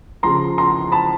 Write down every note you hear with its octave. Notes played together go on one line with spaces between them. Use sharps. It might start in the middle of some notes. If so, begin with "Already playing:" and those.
C#3 F3 A#5 C6
A#5 C6
A5 B5